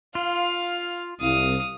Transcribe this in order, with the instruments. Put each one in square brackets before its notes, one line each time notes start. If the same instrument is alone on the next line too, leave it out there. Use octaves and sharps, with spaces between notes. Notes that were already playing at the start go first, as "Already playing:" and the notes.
[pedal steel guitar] F4 [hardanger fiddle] F5
[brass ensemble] C2 [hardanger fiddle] F5 [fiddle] D#6